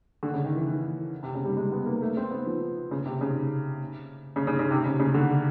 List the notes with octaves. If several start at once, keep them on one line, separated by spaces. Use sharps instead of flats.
D3
C#3
D#3
E3
E3
C3
C#3
G3
G#3
B3
A#3
A3
C4
B3
F3
C#3
C3
C#3
C#3
C#3
C#3
C3
C#3
C#3
D3